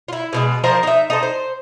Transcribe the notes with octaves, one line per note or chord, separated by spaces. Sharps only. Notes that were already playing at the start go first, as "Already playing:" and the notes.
E4 F4
B2 E3 G#3
F3 A#4 C5 D#5
D#4 E5
D#4 A4 C5
C5